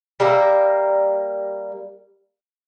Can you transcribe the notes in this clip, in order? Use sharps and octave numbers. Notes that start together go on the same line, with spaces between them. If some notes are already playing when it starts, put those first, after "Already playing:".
G3 A#3 A#4 E5